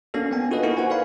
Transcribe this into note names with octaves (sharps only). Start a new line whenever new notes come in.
A#3 C#4 D4 F#4 A4
A#3 B3 D4 G5 G#5
F4 F#4 A4 B4 D#5
A#3 D#4 E4 F#4 A#4
F#4 C5 F#5 G#5
A4 B4 D5 F5 G#5 B5